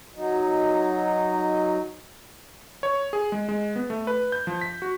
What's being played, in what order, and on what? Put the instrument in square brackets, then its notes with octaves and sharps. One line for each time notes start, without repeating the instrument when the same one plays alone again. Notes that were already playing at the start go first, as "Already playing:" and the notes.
[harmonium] F#3 D#4
[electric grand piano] C#5
G#4
G#3
G#3
B3
A3
B4
G6
F3
B6
F#4